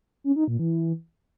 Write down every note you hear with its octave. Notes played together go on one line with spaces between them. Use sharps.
C#4
D#4
A#2
E3